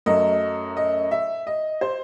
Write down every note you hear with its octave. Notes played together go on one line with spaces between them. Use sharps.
F#2 F#3 A3 D#5
D#5
E5
D#5
C5